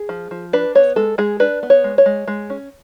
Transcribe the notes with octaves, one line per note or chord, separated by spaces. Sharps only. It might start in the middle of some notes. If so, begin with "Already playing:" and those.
Already playing: G#4
F3
F3
D4 B4
B3 C#5
G#3 A4
G#3 G#4
D4 B4
B3
C#5
G#3
C#5
G#3
G#3
C#4